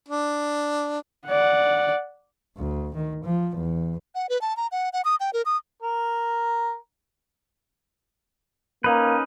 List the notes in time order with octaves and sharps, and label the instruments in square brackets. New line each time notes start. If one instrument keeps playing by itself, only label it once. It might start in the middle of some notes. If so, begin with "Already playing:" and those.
[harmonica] D4
[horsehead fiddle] D5 F#5
[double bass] D2
D#3
F3
E2
[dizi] F#5
B4
A5
A#5
F#5
F#5
D#6
G5
A#4
D#6
[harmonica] A#4
[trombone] A#3 [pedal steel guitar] C#4 D#4 B4